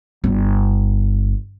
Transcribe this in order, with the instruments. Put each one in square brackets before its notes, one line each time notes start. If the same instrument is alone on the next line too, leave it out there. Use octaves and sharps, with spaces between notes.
[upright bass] G1